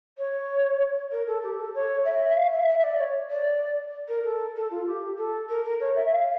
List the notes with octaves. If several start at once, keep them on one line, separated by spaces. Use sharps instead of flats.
C#5
A#4
A4
G4
A4
C#5
E5
E5
F5
E5
E5
E5
D5
C#5
D5
A#4
A4
A4
F4
G4
A4
A#4
A#4
C#5
E5
F5